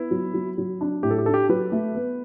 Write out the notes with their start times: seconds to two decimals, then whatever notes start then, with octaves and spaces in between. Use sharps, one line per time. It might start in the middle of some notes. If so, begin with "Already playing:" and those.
Already playing: B3 E4
0.11 F#3
0.34 F#3
0.58 F#3
0.81 D4
1.03 A2 G4
1.11 A4
1.19 G4
1.26 D4 A4
1.34 G4
1.49 F#3 B4
1.72 A3
1.95 B3